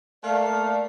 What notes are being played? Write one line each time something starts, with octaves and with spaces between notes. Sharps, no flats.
A3 A#3 D5 F5